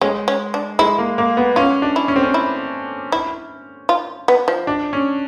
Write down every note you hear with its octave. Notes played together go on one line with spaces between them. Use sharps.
G#3 C#4
C#4
D4
G#3 E4
A#3
A#3
B3
C#4 F4
D4
E4
C#4
C4
C#4
E4
E4
F4
B3
F3
D4
C#4